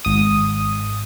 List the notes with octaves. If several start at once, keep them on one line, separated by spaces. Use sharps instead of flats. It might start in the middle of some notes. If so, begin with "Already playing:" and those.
G#1 D#6